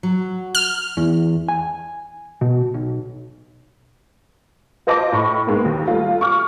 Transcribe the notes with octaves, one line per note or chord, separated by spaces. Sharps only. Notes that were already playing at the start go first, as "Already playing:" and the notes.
F#3
F6
E2
G#5
B2
B1
F4 C5 D#5 A5 D6
A2 B5 C#6
G#2 G#3 A#3 B3
D#2
G3 A3 F4
C#6 D6 F6